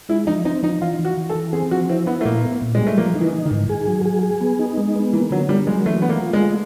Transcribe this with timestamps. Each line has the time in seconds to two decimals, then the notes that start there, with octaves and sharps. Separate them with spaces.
0.09 G#3 E4
0.27 F3 D#4
0.45 C4 D#4
0.63 F3 D#4
0.81 E3 F4
0.99 E3
1.05 F#4
1.18 E3
1.29 A4
1.35 E3
1.53 C4 G#4
1.71 F3 F#4
1.89 C4 E4
2.07 B3 E4
2.21 A3
2.25 A#2 A#3
2.43 B3
2.62 A#2
2.75 G3 G#3
2.87 A3
2.98 F3 A#3
3.15 D#4
3.21 E3
3.33 D#4
3.45 D#3
3.51 G#2
3.69 G#4
3.88 F#3
4.06 G#4
4.23 G#4
4.41 B3
4.59 D#4
4.78 G#3
4.96 B3
5.13 E3 A#3
5.31 D3 F#3
5.49 G3 A#3
5.67 F#3 G#3
5.86 E3 A3
6.02 A3 B3
6.09 A#3
6.22 F4
6.33 G#3
6.39 A3